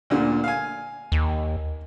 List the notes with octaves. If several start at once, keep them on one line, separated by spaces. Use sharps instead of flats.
D2 A#2 D3
F5 G#5
D#2